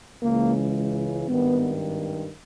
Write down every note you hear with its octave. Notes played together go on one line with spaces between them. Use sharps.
C#2 C#3 E3 G#3 A#3
G#1 G2 D#3 B3